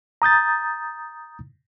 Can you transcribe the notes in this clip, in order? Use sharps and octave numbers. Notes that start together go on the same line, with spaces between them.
A#5 D#6 G6 A6